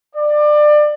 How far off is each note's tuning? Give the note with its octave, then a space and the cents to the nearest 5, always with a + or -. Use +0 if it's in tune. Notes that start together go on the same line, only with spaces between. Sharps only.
D5 +25